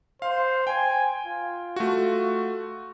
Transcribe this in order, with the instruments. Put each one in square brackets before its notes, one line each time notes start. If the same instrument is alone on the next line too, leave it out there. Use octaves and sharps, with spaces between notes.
[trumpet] C5 [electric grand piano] F5
[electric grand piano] G5 [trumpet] G#5
[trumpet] F4
[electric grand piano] A3 F#4